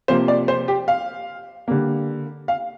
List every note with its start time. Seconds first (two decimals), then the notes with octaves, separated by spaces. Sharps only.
0.08 C3 F3 A#3 C5
0.28 D5
0.48 C5
0.68 G4
0.88 F5
1.68 D3 G3 A#3
2.48 F5